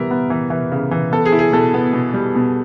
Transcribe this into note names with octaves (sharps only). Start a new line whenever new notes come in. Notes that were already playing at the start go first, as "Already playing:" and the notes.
Already playing: E3 G3 B3 A#4 E5
B3
E3
E3
C#3
E3
B3 A4
G#4
E4
G#4
B2 A4
B3
B2
G3
B2